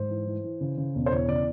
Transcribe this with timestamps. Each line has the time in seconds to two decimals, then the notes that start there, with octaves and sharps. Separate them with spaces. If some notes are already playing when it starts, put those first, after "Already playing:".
Already playing: G#2 C5
0.10 E3
0.26 E3
0.44 E3
0.61 C#3
0.77 C#3
0.95 E1
1.06 C5
1.11 E2 C#5
1.28 C#3 D5